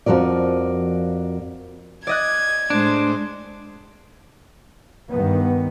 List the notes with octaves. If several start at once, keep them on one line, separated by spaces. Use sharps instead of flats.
F2 F3 F#4 A#4 D5
D5 D#5 F#6 G#6
A2 G#3 D4 C5
G2 D#3 B3